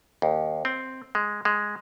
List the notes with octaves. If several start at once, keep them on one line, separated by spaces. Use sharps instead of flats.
D#2
C4
G#3
G#3